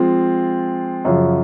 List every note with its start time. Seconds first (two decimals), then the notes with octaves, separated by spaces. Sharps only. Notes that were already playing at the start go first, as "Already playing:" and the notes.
Already playing: F3 G#3 C4 F4
1.05 F#2 C#3 F3